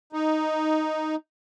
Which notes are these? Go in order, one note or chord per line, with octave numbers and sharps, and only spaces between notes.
D#4